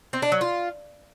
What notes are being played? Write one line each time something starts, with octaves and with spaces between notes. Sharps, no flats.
C4
D4
F#3
F4